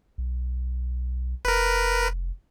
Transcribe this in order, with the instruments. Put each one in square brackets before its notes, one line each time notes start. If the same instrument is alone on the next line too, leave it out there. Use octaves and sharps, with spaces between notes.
[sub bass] B1
[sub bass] F1 [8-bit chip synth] A#4 B4